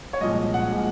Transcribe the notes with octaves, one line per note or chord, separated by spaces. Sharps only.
C#5
C2 A#2 F3 G#3 D#5
F#5
A#2 F3 G#3